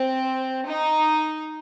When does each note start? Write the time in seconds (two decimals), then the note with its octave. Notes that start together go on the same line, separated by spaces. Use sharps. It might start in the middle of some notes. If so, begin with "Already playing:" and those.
Already playing: C4
0.68 D#4